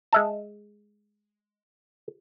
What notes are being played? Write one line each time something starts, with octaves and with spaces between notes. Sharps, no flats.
G#3 E5 A5